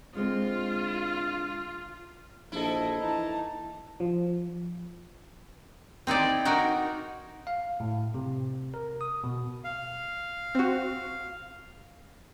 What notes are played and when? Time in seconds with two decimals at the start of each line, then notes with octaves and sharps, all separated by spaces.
0.15 D3 G#3 C4 F4
2.52 A#1 E4 A4 C5 D#5
3.00 E3 D#4 A5
4.00 F3
6.07 C4 D#4 E4 D5
6.45 D#4 F#4 A#4
7.47 F5
7.80 A2
8.14 C3
8.74 A#4
9.01 D#6
9.24 B2
9.64 F5
10.55 C4 F#4